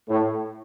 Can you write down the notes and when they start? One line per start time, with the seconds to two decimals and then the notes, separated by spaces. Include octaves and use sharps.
0.08 A2